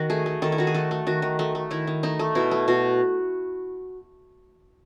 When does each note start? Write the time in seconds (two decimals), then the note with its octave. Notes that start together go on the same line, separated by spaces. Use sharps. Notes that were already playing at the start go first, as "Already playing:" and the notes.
Already playing: D#3 F#4
0.10 A3 G#4
0.26 A3
0.42 D#3 A4
0.52 E4
0.58 D#3 F#4
0.67 G#4
0.74 A3 A4
0.91 A3
1.07 D#3 F#4
1.22 D#3
1.39 A3
1.55 A3
1.71 D#3 E4
1.87 D#3
2.03 A3 D#4
2.19 A3
2.35 B2 E4
2.51 A3
2.68 B2 F#4